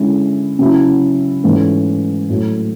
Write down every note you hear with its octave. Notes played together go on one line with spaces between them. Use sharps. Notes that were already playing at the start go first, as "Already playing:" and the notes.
Already playing: D3 G#3 C#4 E4
C#3 F#3 C#4 E4
G#2 E3 A3 C#4
A2 F#3 A3